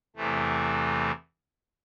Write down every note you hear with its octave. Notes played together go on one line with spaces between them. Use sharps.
E2 C3 E3 A3